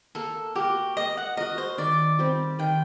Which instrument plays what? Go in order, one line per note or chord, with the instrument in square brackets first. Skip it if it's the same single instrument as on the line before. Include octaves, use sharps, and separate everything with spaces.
[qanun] A#3 [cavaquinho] A4
[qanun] F#4 A#4 [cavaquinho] G4
[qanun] A#3 [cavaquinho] D#5
[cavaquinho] F#5
[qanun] F#4 A#4 [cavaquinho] D#5
[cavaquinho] C5
[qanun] D#3 [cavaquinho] D5
[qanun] G3 C4 G4
[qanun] D#3 [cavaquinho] G5